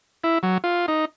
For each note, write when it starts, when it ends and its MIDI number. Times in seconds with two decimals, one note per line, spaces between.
0.24 0.38 64
0.43 0.58 54
0.64 0.86 65
0.88 1.05 63